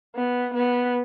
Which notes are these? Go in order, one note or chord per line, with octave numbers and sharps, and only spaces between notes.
B3
B3